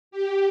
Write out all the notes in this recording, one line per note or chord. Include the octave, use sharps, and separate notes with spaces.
G4